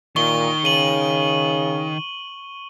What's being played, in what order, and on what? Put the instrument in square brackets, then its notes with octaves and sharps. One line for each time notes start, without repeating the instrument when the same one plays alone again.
[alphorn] A#2 [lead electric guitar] D#3 [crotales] C#6 G7
[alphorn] C#3 [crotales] D#7 F#7